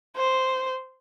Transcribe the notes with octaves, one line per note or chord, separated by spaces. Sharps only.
C5